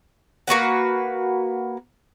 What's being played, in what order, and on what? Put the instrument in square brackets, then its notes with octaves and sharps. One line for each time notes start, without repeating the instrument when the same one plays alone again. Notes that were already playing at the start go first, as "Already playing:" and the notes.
[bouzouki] A#3 F#4 B4 F#5